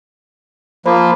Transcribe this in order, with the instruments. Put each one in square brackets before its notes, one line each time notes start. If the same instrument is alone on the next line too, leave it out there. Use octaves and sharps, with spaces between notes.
[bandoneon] F3 A#3 [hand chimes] C5 B5